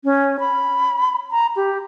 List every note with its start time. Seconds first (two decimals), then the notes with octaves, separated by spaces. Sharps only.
0.04 C#4
0.40 B5
1.31 A#5
1.56 G4